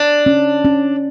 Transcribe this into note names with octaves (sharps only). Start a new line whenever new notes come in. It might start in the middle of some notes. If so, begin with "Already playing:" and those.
Already playing: D4
C#4
C#4